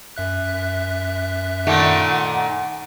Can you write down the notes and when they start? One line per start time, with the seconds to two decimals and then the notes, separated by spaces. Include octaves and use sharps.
0.16 F#2 E5 F#6
1.67 A#2 D#3 A3 F#5